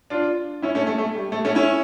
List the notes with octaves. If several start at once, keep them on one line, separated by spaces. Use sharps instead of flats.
D4 F4
C#4 E4
A3 C#4
A3
A3
G3
A3
A3 C#4
C#4 E4